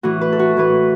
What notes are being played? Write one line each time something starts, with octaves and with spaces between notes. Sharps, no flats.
A2 E3 F#4
B4
A4
F#4
A2 E3 B4